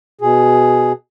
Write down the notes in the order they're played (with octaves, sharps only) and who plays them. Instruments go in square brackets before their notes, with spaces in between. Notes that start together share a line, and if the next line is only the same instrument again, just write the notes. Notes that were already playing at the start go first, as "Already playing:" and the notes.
[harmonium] B2 G#4